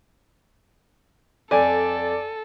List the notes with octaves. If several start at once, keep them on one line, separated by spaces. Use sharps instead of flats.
F2 A4 D5 G#5